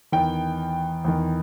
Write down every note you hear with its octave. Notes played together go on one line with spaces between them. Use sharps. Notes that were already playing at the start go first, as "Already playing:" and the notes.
E2 D#3 G5
E2 D#3